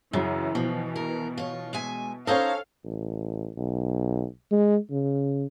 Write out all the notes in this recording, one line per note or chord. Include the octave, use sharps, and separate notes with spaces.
F#2 C#3 E3 F#3
B2 F3
A#4
F4 C#5
G#3 E5 G#5
C#4 D#4 A4 C5 C#5 F5
A1
B1
G#3
C#3